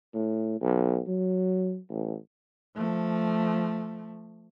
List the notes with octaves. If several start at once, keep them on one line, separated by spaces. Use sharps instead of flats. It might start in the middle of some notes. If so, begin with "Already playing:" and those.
A2
B1
F#3
A1
F3 A3